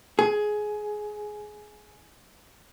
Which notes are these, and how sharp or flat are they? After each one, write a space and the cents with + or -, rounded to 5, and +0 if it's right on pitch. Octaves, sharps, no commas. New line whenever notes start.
G#4 +15